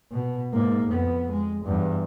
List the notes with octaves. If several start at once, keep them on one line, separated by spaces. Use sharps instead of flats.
B2
G#2 A#3
F2 B3
G#3
E2 G2